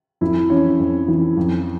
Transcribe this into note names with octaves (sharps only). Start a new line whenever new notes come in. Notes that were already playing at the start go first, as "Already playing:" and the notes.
F2 E4
E3 C#4 C#5
F2
E3
F2